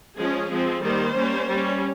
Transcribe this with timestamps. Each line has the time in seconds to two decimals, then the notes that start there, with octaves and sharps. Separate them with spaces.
0.16 F3 G#3 C#4 G#4
0.49 F3 G#3 C4
0.82 D#3 G3 A#3 C5
1.15 G3 A#3 C#4
1.49 G3 C#4